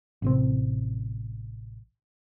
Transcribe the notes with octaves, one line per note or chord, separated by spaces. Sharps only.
A1 C3 C4